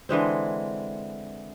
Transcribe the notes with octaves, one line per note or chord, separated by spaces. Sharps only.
D3 E3 G#3 C4